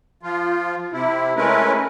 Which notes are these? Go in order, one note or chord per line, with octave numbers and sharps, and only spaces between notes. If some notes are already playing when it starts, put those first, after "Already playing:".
F3 F4
C3 E4
G#3 A3 C#4 E4 A#4 B4